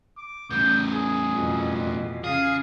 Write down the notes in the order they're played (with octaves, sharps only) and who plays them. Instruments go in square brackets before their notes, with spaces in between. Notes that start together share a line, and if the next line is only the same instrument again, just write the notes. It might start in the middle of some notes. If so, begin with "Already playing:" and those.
[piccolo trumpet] D6
[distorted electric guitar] E2 A2 [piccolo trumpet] G6
[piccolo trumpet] G#4
[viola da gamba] F2 B2 E3
[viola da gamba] C#3 [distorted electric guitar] G#4 [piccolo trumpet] F5